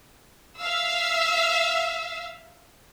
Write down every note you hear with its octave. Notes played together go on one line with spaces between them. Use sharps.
E5 F5 E6